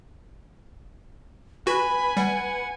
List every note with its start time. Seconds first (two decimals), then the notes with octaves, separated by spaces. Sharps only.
1.67 F#4 B4 G#5 B5
2.17 G3 F#5